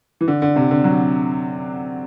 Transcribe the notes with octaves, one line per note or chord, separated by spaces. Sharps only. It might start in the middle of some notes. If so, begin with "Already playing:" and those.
E3
D3
D3
C3
D3
F#3